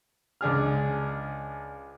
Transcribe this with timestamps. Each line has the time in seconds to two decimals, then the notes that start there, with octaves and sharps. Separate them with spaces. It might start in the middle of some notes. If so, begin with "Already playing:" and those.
0.41 C#2 D4 G#4 F6